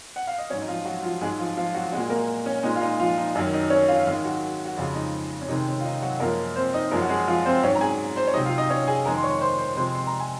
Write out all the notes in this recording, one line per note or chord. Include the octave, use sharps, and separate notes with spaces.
F#5
F5
D#5
G#2 F#3 C#4 C#5
D#4
F3 F4
F#3 F#4
F3 F4
G#2 F#3 G#3 G#4
F3 F4
F3 F4
F#3 F#4
A#2 F#3 G#3 F#4
A#3 A#4
C#4
A#2 G#3 D#4
F4
D#4
F3 F4
D#4
F#2 D#3 F#3 D#4
D#4
C#4 C#5
F4 F5
G#2 D#3 G#3 F4 F5
F#3 F#4
F#4
F2 C#3 F3 G#3 F4
D#4
C#4
C3 D#3 G#3 D#4
C#4
F4
D#4
F#3 F#4
F#2 F3 G#3 A#3 A#4
C4 C5
D#4 D#5
F#2 F3 G#3 A#3 A#4
F#4
G#3 G#4
F3 F4
C4 C5
G#2 F#3 C#4 C#5
A#5
G#4 G#5
C5 C6
C#5
C3 F#3 D#4 D#5
F4 F5
D#4 D#5
C#4 C#5
G#4 G#5
F2 D#3 G#3 A#4 A#5
C6
C#5 C#6
C5 C6
C5 C6
C3 F3 G#3 C5 C6
C6
A#5
G#5